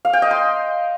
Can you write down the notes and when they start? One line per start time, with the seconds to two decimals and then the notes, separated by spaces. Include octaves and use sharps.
0.05 F5
0.13 G5
0.22 D#5
0.31 C6